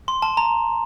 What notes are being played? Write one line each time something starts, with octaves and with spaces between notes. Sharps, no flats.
C6
A5
A#5